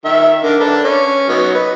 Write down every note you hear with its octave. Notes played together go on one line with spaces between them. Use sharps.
D#3 E5
D3 A#4
D4 A4 B4
C#4
F#3 B3 D#4
B4